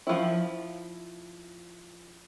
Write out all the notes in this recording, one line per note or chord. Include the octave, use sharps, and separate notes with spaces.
F3 E4